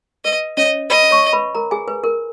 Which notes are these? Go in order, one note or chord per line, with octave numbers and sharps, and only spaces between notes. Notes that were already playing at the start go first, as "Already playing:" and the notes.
B4 D#5
C#4 C#5 D#5
B4 D#5 B5
C#5 C#6
B4 B5
A#4 A#5
G#4 G#5
B4
A#4